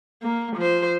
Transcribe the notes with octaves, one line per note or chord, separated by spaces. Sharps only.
A#3
F3 C5